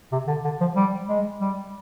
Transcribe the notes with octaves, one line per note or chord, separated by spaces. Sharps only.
C3
D3
D3
F3
G3
G#3
G3